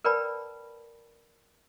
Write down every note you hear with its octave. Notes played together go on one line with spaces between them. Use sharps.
A#4 B4 D5 G5 A5 B5